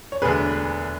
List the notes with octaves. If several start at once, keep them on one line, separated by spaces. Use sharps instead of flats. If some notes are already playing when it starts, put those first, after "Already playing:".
C#5
E1 D2 D3 G#4 B4